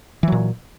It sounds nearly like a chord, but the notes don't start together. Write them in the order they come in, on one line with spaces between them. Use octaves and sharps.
E3 F#3 A#2